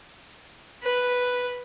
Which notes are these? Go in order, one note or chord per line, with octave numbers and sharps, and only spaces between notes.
B4